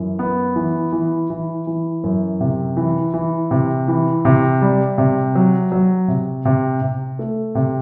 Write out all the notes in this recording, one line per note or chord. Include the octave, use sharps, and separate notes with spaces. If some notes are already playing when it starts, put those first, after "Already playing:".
Already playing: F#2 E3
B3
E3
E3
E3
E3
F#2
C3
E3
E3
C3
E3
C3
G3
C3
F#3
F#3
C3
C3
C3
A3
C3